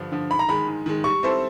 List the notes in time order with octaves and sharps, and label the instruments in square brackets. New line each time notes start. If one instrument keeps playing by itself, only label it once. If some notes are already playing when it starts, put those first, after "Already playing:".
Already playing: [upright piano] G2 D3 F3
D3 F3
[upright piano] G#2 [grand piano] B5
[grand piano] A#5
[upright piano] D#3 G#3 [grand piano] B5
[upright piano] G#2
D#3 G#3
[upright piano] G3 [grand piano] C#6
[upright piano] C4 E4 A4 C5